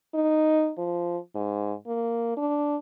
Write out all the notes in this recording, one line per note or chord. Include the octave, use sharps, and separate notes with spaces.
D#4
F3
G#2
A#3
D4